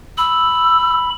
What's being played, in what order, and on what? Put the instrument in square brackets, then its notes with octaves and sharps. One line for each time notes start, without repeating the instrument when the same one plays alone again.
[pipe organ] B5 [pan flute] E6